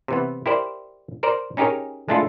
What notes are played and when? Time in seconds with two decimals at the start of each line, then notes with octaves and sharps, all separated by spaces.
0.08 C3 E3 B3
0.46 E4 G4 A#4 C5 D5
1.23 A#4 C5 D5 A#5
1.57 C#4 D#4 G4 G#4 A#4 C#5
2.08 G#3 A3 D4 E4 F4 A4